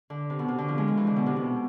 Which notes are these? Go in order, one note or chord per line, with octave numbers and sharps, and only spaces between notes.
D3
C3
B2
C3
D3
F3
G#3
F3
E3
D3
B2
C3
B2